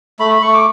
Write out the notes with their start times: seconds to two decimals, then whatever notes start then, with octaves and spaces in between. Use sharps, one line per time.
0.19 A3 B5
0.31 B5
0.42 A3 C#6
0.54 D6